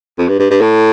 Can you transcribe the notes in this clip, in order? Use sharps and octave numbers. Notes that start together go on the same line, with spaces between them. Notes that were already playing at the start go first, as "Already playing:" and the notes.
F2
G2
G2
G2
A2